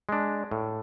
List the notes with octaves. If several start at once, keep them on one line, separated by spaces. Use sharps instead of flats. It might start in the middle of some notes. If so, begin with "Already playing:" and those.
G#3 D4
A2